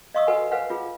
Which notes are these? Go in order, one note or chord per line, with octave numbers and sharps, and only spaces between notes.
D#5 F5 C#6 D#6 E6
F#4 A4 B4 F#5 G#5
B4 C5 F5 F#5 G#5
F4 G#4